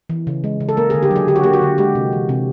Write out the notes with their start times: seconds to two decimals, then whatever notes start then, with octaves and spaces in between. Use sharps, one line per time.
0.10 E3
0.27 C#3
0.44 G#3
0.60 C#3
0.69 A4
0.77 A#3 A#4
0.90 G#4
0.94 D3
1.03 G4
1.11 F#3
1.16 G#4
1.28 D3 G4
1.36 F#4
1.44 A#3 G4
1.53 F#4
1.62 D3
1.78 G#3 G4
1.95 C3
2.13 E3
2.29 C3